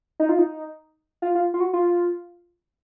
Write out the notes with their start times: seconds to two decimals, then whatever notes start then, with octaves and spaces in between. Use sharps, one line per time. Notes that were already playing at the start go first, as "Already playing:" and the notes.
0.20 D#4
0.29 F4
0.39 D#4
1.22 F4
1.35 F4
1.54 F4
1.60 F#4
1.73 F4